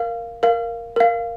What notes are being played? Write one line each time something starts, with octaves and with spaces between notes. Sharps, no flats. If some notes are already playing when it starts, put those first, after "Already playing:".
Already playing: A#4 F5
A#4 F5
A#4 F5